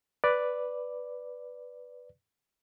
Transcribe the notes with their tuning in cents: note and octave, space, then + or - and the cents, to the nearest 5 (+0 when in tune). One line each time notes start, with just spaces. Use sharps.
B4 +0 D5 +0